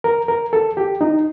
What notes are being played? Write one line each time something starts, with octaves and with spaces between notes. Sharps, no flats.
A#4
A#4
A4
G4
D#4